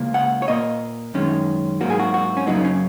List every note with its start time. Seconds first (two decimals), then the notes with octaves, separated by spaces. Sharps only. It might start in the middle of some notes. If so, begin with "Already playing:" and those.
Already playing: C#2 C#3 A#3
0.14 F#5
0.42 C#5
0.48 A#2 A#3 D#5
1.14 F#2 D#3 G#3 C#4
1.81 G#2 F#3 A#3 F#4
1.90 G#4
1.99 F#4
2.14 F#4
2.37 C#4
2.47 F#2 C#3 F#3 A#3 D#4
2.65 C#4